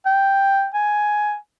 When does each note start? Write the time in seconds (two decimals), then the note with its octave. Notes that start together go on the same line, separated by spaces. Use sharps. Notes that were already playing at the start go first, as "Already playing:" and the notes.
0.06 G5
0.74 G#5